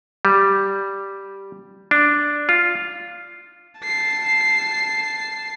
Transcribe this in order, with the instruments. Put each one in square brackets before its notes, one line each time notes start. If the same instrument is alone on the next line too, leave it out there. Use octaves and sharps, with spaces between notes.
[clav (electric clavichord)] G3
D4
F4
[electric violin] A5 C7